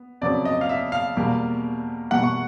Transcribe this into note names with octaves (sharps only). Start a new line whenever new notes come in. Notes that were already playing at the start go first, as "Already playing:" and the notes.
Already playing: B3
F2 C#3 F#3 B3 D5
D#5
F5
E5
F5
E2 B2 G3 A#3
E2 B2 G3 A#3 F#5
C#6